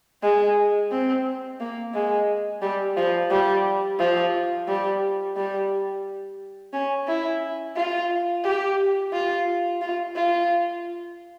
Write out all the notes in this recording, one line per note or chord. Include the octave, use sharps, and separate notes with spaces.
G#3
C4
A#3
G#3
G3
F3
G3
F3
G3
G3
C#4
E4
F4
G4
F4
F4
F4